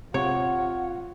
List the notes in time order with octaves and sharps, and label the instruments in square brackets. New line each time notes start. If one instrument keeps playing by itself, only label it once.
[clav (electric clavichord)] C3 [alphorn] F4 [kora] C#5 [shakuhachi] F#5